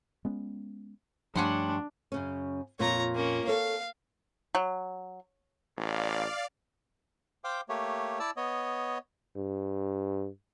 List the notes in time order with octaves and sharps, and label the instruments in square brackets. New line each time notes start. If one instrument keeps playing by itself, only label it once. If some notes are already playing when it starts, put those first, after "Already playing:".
[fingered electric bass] G#3 B3 C#4
[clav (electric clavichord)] G2 [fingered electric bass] F3 A3 [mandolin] C#4 F#5 C6 [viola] D4
[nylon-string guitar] F#2 C#3 C#4
[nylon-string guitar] F2 A#2 F4 [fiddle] C#5 A#5
[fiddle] A#3 C#4
[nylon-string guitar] A4 C#5 [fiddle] F5
[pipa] F#3
[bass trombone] A1 [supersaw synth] D5 F5
[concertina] C5 F5 G5 D6
A3 A#3 G4 C#5
E4 D5 A5 E6
B3 C#5 D#5
[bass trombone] G2